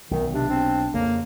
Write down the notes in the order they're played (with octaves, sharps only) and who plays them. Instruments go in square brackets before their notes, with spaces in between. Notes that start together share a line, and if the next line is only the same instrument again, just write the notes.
[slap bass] B1 [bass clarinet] D#3
[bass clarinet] C3 [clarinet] D4
[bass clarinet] C4
[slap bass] F2 C#3 [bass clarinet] A#3